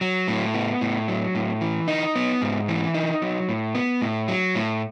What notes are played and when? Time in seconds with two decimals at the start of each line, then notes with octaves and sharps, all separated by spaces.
0.01 F#3
0.28 A2
0.54 B3
0.81 A2
1.08 F#3
1.35 A2
1.61 E3
1.88 D#4
2.15 B3
2.42 G#2
2.68 E3
2.94 D#4
3.22 F#3
3.49 A2
3.75 B3
4.02 A2
4.28 F#3
4.55 A2